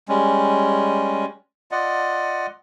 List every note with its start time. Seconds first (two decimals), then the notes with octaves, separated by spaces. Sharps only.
0.09 G3 G#3 C#4
1.72 F4 D5 D#5 F#5